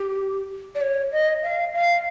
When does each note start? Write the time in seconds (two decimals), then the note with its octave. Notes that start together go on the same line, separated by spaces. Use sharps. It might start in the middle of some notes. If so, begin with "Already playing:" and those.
Already playing: G4
0.75 D5
0.81 C#5
1.12 D#5
1.43 F5
1.73 F5